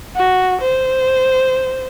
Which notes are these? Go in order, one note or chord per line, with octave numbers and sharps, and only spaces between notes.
F#4
C5